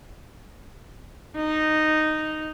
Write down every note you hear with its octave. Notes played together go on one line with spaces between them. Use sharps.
D#4